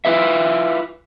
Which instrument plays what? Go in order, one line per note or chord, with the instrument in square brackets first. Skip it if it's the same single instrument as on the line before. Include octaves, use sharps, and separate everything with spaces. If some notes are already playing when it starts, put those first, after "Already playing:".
[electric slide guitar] E4 F4 G#4 A4 B4 E5